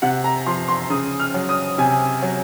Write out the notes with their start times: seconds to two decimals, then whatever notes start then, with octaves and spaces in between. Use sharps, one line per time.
0.02 C3 F#5
0.24 A#5
0.46 F3 C6
0.68 C6
0.90 C#3 D#6
1.20 F6
1.34 F#3
1.49 D#6
1.78 C3 G#5
2.22 F#3